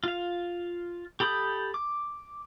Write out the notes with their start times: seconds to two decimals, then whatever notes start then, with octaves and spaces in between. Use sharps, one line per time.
0.04 F4 F5
1.20 G4 A4 B5 D#6 G6
1.74 D6